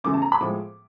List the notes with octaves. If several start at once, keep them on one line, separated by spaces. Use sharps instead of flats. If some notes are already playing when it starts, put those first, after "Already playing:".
F#2 C#3 E3 A3 D6
A5
A#5
B5
A2 F3 G#3 D6